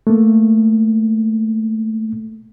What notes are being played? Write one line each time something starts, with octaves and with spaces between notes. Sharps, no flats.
A3 A#3